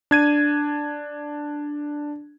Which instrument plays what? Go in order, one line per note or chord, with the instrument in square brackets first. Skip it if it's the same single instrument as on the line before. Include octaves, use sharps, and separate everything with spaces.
[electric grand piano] D4 G#6 D#7